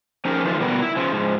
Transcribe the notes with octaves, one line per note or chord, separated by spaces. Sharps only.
F3 C#4 D#4 G4 G#4 A#4
E3 F3 G#3 A3 F4
B2 G3 B3 A#4
E4
C#3 F3
G#2 F3